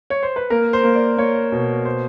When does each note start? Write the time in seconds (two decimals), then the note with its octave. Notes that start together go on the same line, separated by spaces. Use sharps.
0.10 C#5
0.23 C5
0.36 B4
0.50 A#3 A#4
0.73 C5
0.83 A#3
0.95 D5
1.17 A#3 C#5
1.52 B2
1.85 C5